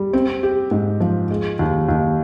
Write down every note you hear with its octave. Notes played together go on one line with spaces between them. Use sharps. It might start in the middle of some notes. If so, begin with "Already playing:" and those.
Already playing: G3
C4
G4
G#2
F3
G#3
D#2
D#2